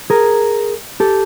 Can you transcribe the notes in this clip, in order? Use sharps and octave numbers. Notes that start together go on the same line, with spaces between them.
G#4 A#4
G4 A4